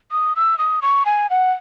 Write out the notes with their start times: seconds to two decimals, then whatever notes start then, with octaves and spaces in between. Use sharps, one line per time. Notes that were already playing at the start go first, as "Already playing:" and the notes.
0.12 D#6
0.36 E6
0.58 D#6
0.82 C#6
1.06 G#5
1.30 F#5